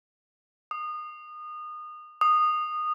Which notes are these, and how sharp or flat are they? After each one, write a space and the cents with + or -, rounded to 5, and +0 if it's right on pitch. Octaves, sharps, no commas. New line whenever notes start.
D#6 -30
D#6 -20